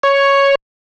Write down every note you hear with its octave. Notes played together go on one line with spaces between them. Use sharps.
C#5